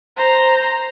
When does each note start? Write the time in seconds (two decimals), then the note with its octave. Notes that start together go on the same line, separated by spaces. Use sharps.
0.17 C5 A#5